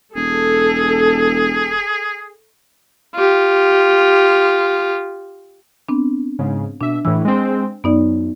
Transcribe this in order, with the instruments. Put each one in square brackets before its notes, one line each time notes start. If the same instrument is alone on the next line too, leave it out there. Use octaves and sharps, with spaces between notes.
[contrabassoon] E1 [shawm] G#4 [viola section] A4
[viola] F4 G4
[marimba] B3 C4 D4
[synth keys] G#2 C#3
[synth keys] B2 E5 [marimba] D4
[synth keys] A2 E3 [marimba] E6
[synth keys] G#3 C4
[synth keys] F#2 [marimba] B3 D#4 D5